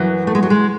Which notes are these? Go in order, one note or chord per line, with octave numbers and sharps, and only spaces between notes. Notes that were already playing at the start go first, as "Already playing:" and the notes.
Already playing: F#2 E3 F#3
A3
G#3
F#3
G#3